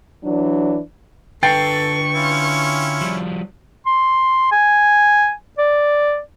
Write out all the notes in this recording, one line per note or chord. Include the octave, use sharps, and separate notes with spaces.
E3 F#3 D4
D3 A4 B4 G5 C#6 A6 C7
C#4 E4 F4
F3 G3
C6
G#5
D5